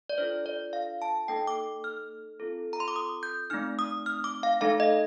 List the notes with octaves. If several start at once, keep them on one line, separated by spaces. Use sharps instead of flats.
D5
D4 F4 A4 C5
D5
F5
A5
A#3 D#4 A4 G5
D6
F6
C4 F4 A4
A#5
C6
D6
D#6
G6
A3 C4 D#4 F6
D#6
F6
D6
F5
A3 D#4 A4 F5
D#5